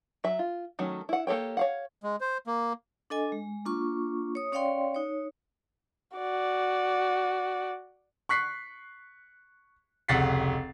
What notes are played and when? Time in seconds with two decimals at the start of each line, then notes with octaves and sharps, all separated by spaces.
0.24 F#3 E5
0.39 F4
0.79 D#3 F#3 A3 C#4
1.09 E4 F#5
1.27 A#3 G4 A4 C#5 G5
1.57 C#5 F5 F#5
2.03 G#3
2.21 C5
2.47 A#3
3.10 D4 A4 D#5 G#5
3.32 G#3
3.65 A#3 D4 F4 C#6
4.35 C#5 D#6
4.52 C#4 C#5 D5 F5 G5 C6
4.95 D#4 C#5
6.17 F#4 D5
8.29 C#6 F#6 B6 C7
10.08 F1 C#2 F#5 A6 B6 C7